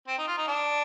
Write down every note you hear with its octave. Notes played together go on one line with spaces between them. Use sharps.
C4
D#4
F4
D#4
D4